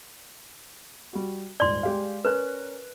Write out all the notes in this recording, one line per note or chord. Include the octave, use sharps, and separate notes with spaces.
G3 F#4
D#1 G#2 D5 C6 G7
G#3 G4 F5
C#4 A#4 B4 F#6